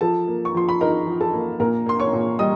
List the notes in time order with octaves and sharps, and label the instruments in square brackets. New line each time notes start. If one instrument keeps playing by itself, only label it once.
[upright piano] F3 A4 A5
A#3
C#6
F3 C6
B5
D#4 A#4 A#5
F3
A4 A5
A#3
A#2 A#4 A#5
A#3 C6
C#5 C#6
A#2
G3 D#5 D#6